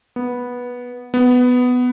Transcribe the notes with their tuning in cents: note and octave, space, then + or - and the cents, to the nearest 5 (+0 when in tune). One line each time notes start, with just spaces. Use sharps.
B3 -10
B3 +10